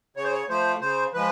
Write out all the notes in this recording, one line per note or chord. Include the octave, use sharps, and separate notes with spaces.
C#3 C#5
C5
C#5
F3 A3 C5
C#3 C5
F3 G#3 B4